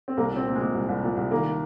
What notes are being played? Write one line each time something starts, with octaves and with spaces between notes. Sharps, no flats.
C4
C2 A#3
A#2 C4
A#2
G#3
A#2
C2
C2
A#2
C2
D#3 A#3